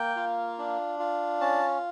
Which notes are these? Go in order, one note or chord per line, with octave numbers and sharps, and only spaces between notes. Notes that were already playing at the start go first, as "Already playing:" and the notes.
Already playing: A#3 G5
F4
D4
F4
C#4 A5